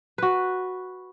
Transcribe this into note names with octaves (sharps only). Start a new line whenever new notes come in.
F#4 B4